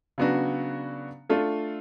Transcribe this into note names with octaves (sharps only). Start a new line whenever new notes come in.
C#3 F#3 B3 D4 F#4
A3 D4 F4 A4